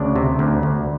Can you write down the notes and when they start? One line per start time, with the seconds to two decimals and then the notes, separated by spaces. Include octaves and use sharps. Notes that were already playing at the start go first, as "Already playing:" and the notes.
Already playing: D2 C#3 D4 D5
0.16 C3
0.39 D2
0.63 D2